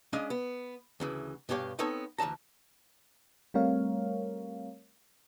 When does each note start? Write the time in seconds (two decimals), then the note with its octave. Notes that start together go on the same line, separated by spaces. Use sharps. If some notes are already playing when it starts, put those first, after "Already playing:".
0.13 G#3 C#4 D4 D#5 F5
0.30 B3
1.00 D2 C#3 E3
1.49 G2 B2 G4 C#5 F5
1.79 B3 C4 D#4 A4 C#5
2.18 D2 E3 D4 A5 A#5
3.54 G3 A3 C4 A#4 C#5 F5